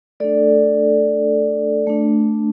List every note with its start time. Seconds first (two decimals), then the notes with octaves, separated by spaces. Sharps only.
0.20 A3 D4 A4 D5
1.87 A3 D4